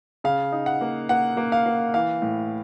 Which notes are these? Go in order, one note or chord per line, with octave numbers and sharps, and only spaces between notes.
C#3 F5
D#4
F#5
A#3
A#3 F#5
A#3
F5
A#3
E3 F5
A2